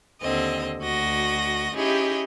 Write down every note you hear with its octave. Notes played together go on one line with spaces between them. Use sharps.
D#2 D3 C4 D#5
D2 F#4 D#5 A#6
C#4 D#4 E4 G4 G#4 D#5